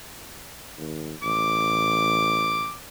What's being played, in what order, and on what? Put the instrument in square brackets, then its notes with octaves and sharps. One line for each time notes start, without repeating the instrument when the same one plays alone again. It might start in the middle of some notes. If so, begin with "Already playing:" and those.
[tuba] D#2
[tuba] A1 [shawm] D6